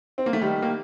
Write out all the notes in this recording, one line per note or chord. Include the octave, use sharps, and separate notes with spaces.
C4
A#3
A3
D#3 G3
A#3